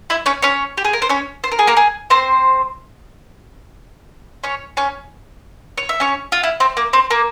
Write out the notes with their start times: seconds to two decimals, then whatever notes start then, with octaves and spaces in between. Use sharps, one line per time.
0.10 E4 E5
0.26 C#4 C#5
0.42 C#4 C#5
0.78 G4
0.85 G#4
0.93 A#4
1.02 C5
1.09 C#4 C#5
1.44 C5
1.52 A#4
1.59 G#4
1.67 A#3 A#4
1.77 G#4
2.10 C4 C5
4.44 C#4 C#5
4.77 C#4 C#5
5.78 C#5
5.89 E5
6.00 C#4 C#5
6.32 F4
6.43 E4
6.60 C4
6.77 A#3
6.93 C4
7.11 A#3